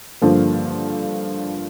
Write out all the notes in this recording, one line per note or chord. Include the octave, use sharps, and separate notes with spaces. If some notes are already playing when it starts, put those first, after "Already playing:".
G2 D3 F3 A#3